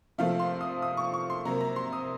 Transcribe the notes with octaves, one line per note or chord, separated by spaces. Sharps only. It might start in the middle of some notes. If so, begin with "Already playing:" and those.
C3 F3 A3 F5
C6
D#6
D#6
C#6
C#6
C6
C3 F#3 A#3 A#5
A#5
C6
D#6